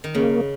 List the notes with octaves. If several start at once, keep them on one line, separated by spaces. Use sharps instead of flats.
D#3
C#3 A#3